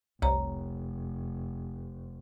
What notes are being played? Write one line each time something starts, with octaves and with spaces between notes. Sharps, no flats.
F1 C2 C#5 A#5